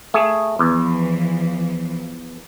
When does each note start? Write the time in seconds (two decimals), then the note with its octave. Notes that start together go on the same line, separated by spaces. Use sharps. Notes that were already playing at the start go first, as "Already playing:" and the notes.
0.14 A3 G#4
0.59 E2 E3 F3